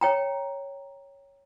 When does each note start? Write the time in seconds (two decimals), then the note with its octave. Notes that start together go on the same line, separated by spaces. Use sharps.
0.01 C#5 G5 A#5